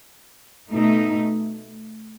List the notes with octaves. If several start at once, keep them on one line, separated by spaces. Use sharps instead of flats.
B2 A3 D#4